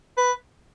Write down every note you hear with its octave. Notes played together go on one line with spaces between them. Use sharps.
B4